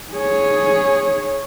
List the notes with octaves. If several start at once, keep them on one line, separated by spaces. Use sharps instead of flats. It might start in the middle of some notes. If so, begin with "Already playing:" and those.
G#4 C#5